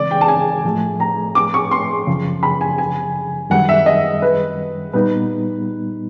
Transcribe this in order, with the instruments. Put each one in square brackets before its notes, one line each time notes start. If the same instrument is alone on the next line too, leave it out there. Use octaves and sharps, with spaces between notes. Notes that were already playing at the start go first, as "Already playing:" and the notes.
Already playing: [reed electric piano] C#3 E3 G#3 C4 [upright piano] D5
[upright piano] G5
A5
G#5
[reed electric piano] A2 F3 A3
[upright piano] A#5
D6
C#6
C6
[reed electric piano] F#2 C#3 F3
[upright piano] B5
G#5
G#5
[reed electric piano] F#2 D#3 G3 [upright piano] F#5
[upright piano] E5
D#5
B4
[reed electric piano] A#2 G3 B3 D#4 [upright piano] B4